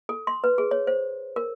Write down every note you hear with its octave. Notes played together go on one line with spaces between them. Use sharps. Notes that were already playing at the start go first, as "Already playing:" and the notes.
A4
C6
B4
G#4
C#5
C5
A#4